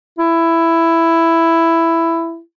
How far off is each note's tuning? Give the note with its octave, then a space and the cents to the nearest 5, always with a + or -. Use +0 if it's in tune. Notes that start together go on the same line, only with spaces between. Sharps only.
E4 +10